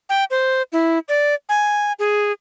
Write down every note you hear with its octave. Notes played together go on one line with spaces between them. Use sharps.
G5
C5
E4
D5
G#5
G#4